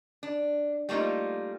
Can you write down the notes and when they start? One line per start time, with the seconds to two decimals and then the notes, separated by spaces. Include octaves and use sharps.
0.23 D4
0.89 G3 A3 A#3 D#4 F4